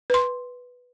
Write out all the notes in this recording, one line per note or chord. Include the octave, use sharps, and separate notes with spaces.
B4 C6